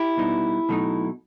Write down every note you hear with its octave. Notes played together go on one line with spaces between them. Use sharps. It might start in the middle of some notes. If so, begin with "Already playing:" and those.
Already playing: E4 G4
B2 G3 B3 D#4
B2 F#3 A3 D#4